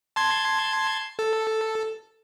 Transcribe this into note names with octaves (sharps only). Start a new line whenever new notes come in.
A5 C6 G#6
A4